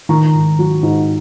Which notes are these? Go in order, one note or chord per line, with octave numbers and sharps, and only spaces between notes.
D#3 A#5 C#6
G#2
F#3
G#2